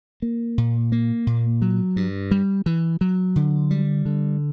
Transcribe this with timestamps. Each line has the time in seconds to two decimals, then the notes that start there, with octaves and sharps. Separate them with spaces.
0.22 A#3
0.58 A#2
0.92 A#3
1.27 A#2
1.62 F#3
1.96 G2
2.31 G3
2.66 E3
3.01 F#3
3.36 D3
3.71 G3
4.05 D3